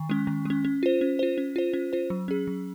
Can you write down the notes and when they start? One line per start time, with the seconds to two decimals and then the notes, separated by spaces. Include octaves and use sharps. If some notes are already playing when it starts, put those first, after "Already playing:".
Already playing: D#3
0.09 G#3 C#4
0.27 D#3
0.45 G#3 C#4
0.65 C#4
0.83 F4 C5
1.01 C#4
1.19 F4 C5
1.38 C#4
1.56 F4 C5
1.74 C#4
1.93 F4 C5
2.10 F#3
2.28 C#4 G#4
2.47 F#3